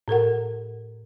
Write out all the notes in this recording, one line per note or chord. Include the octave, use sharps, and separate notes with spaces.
A2 A4 A#4 F#5